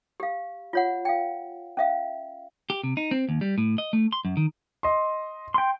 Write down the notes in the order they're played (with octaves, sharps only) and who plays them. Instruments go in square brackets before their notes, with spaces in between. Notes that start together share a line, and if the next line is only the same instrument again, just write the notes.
[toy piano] G4 F5
F4 C#5 F#5
F5 G5
C#4 E5 F5
[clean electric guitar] G4
C3
D#4
C4
D#2
G3
A2
D#5
A3
C6
F#2
D#3
[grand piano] D#5 C6
[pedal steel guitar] G5 C6